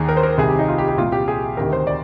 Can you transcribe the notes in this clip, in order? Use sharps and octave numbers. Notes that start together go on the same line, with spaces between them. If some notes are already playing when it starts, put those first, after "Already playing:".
Already playing: D#2 D#3 G#4
A#4
C5
A#4
C2 C3 D#3 G#4
G4
D#4
F4
G4
G4
C2 A#2 F4
G4
G#4
D2 C3 D#3 A#4
C5
D5